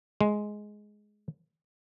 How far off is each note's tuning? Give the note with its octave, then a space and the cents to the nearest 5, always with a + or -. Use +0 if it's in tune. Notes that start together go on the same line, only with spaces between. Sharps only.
G#3 +10